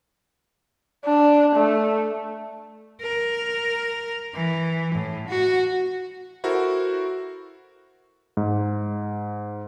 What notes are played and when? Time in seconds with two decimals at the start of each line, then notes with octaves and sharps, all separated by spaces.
1.06 D4
1.56 A3
3.01 A#4
4.34 E3
4.95 A2
5.28 F#4
6.44 E4 F#4 A4 A#4 C5
8.37 G#2